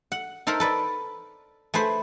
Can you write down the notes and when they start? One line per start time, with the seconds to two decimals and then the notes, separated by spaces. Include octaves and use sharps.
0.12 F#5
0.47 D#4 A4 A#4 C5 E5
0.60 A4 B4 D5
1.74 A3 G#4 B4 C5